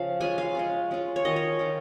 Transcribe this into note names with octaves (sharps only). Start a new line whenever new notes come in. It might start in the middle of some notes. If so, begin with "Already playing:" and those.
Already playing: C#3 F3 F5
G#3 C#4 F4 G#5
F5
G#3 C#4 F4
G#3 C#4 F4
C#5
D#3 C#4 F4 D#5
C#5
D#3 C#4 F4